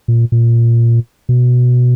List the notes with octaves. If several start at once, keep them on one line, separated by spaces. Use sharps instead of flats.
A#2
A#2
B2